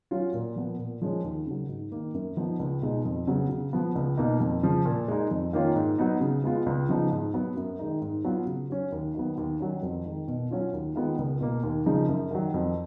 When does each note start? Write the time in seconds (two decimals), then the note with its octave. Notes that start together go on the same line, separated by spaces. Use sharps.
0.11 F#3 C#4 F4
0.34 A#2
0.56 F3 B3
0.78 A#2
1.02 F3 G#3 C#4
1.24 D#2
1.46 C#3 F#3
1.69 G#2
1.92 D#3 A#3
2.14 F#2
2.37 F3 B3 D#4
2.59 C#2
2.82 B2 G#3 D#4
3.05 F2
3.27 C#3 F#3 B3
3.49 C#3
3.73 F3 B3
3.95 C#2
4.17 B2 A#3 D#4
4.40 F2
4.63 C#3 F3
4.86 A#2
5.08 G#3 D#4
5.31 F2
5.53 D#3 A#3 C#4 F4
5.76 G#2
5.99 F#3 B3 D#4
6.21 C#3
6.44 G#3 B3 F4
6.66 C#2
6.89 C#3 F3 B3 D#4
7.11 G#2
7.34 F#3 B3
7.57 F#2
7.79 D#3 G#3 D#4
8.02 G#2
8.24 F#3 B3 F4
8.47 C#3
8.70 F#3 C#4
8.92 D#2
9.14 D#3 F#3 B3
9.38 D#2
9.60 D#3 F#3 C#4
9.83 F2
10.05 D#3 G#3
10.28 B2
10.50 F#3 C#4 F4
10.73 D#2
10.96 D#3 G#3 B3 F4
11.18 C#2
11.41 B2 A#3
11.63 D#2
11.86 C#3 F3 G#3 D#4
12.09 F#2
12.31 D#3 F#3
12.54 F2